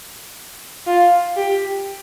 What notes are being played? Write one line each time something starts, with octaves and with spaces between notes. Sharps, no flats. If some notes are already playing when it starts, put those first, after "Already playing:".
F4
G4